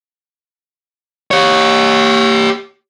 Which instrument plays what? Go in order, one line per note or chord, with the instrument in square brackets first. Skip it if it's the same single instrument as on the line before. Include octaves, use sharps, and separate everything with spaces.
[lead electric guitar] G4 C#5